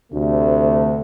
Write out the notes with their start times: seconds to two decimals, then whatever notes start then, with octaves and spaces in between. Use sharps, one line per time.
0.13 D2 C3 A3